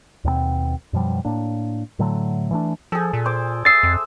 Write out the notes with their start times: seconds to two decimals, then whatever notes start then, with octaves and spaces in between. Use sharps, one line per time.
0.24 D#2 B2 G3 C4
0.93 F#2 B2 F3 G3
1.25 A2 A#3 D4
1.99 A2 D3 F#3 A3
2.51 E3 A3 D4
2.92 F3 G#4 A4
3.13 A#2
3.25 C5 D6
3.65 E5 D#6 E6 A6 C7
3.83 F2